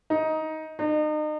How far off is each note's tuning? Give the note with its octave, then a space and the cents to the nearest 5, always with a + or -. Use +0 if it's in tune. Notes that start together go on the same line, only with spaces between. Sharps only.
D#4 +15
D#4 -35